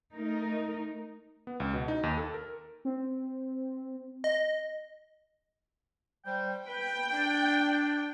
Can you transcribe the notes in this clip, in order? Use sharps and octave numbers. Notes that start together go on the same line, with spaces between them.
A3 D#4 A#4
B3
C#2
B2
D#4
D#2
A4
A#4
C4
D#5
G3 C5 G5
B4 G5
D4